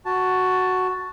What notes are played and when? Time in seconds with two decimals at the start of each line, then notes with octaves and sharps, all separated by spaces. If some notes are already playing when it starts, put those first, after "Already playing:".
0.05 F#4 A5